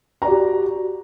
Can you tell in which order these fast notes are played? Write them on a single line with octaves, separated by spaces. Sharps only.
A#5 D5 F#4 G4